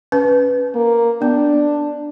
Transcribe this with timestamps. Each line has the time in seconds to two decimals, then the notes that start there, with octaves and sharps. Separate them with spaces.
0.12 C#4 B4
0.75 A#3
1.22 B3 D4